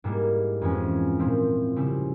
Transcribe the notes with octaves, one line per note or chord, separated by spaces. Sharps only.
G#2 G3 A#3 E4
F2 E3 G#3 C#4
A#2 F3 C4 E4
C#3 G3 C4 E4